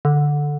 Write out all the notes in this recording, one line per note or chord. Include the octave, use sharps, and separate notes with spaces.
D3